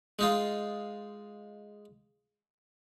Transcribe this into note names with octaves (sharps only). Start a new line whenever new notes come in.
G#3 D#4 F4